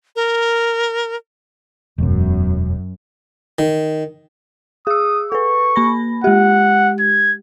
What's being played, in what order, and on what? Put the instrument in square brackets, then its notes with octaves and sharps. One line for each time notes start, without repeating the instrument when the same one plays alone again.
[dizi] A#4
[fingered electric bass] E1 B2 [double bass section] F#2
[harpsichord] D#3
[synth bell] G#4 E6 [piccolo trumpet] D#6
[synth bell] A4 B4 [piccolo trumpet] C#6
[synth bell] A#3 B5 A#6
[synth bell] G#3 G4 [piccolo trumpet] F#5
[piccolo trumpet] G#6